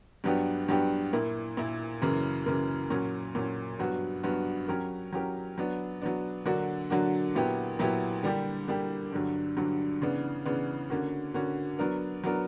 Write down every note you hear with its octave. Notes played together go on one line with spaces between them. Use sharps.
G2 F#3 B3 D4 G4
G2 F#3 B3 D4 G4
A#2 A#3 E4
A#2 A#3 E4
F#2 C#3 E3 A#3
F#2 C#3 E3 A#3
A#2 F#3 C#4
A#2 F#3 C#4
G2 F#3 B3 F#4
G2 F#3 B3 F#4
F#3 C#4 G4 A#4
F#3 C#4 G4 A#4
F#3 B3 D4
F#3 B3 D4
D3 F#3 A#3 D4 F#4
D3 F#3 A#3 D4 F#4
A#2 F#3 B3 E4 G4
A#2 F#3 B3 E4 G4
D3 G3 A#3 D4 G4
D3 G3 A#3 D4 G4
G2 D3 F#3
G2 D3 F#3
C#3 E3 B3 D4
C#3 E3 B3 D4
D3 A#3 C#4 F#4
D3 A#3 C#4 F#4
F#3 B3 D4 A#4
F#3 B3 D4 A#4